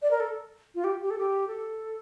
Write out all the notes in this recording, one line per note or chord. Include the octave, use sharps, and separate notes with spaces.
D5
A#4
A4
F4
G4
G4
A4
G4
A4